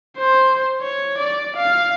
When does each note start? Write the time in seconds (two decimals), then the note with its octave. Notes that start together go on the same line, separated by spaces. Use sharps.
0.18 C5
0.82 C#5
1.18 D5
1.56 F5